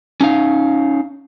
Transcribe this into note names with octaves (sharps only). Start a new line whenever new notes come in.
C#4 D#4 F5